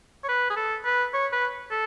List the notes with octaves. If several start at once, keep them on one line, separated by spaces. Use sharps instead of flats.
C#5
B4
G#4
A4
B4
C#5
B4
A4